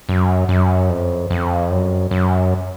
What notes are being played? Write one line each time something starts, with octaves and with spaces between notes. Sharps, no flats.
F#2
F#2
F2
F2
F#2
F#2